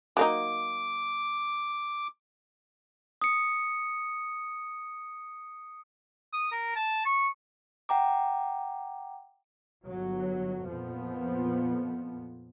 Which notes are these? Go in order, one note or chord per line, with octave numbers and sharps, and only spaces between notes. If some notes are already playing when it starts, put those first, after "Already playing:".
F#3 A#3 D#4 D6
D#6 C#7
D#6
A#4
A5
C#6
F#5 G5 A#5 D6
G1 F#3
F2 A#2 F3 B3